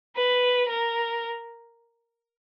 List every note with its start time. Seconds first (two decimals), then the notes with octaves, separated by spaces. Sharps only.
0.17 B4
0.69 A#4